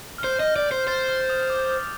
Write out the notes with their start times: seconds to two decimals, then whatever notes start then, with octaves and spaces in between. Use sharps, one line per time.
0.18 F6
0.24 C5 G6
0.40 D#5
0.56 D5
0.72 C5
0.87 C5 A6
1.09 F6
1.29 D#6
1.50 D6
1.66 D6
1.71 D#6